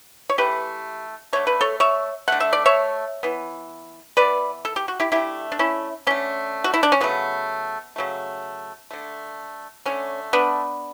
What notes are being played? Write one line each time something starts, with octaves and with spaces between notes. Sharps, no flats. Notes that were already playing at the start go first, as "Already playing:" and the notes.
C#5
E3 A3 G4 B4
D3 A3 C#5
B4
A4 C#5
C#5 E5
D3 A3 F#5
E5
D5
C#5 E5
E3 B3
E3 B3 B4 D5
A4
G4
F#4
E4 G4
D3 A3 E4 G4
D4
C#4 E4
D3 A3 C#4
F#4
E4
D4
C#4
C#3 F#3 A3 B3
C#3 F#3 A3
D3 A3
D3 A3 C#4
B3 D4